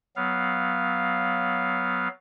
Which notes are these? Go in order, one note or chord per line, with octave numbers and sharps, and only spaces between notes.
F#3 B3 F5